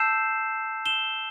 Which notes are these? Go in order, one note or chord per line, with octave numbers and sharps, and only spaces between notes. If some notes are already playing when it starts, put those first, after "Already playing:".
Already playing: A5 E6 G6 C7 E7
E7 G7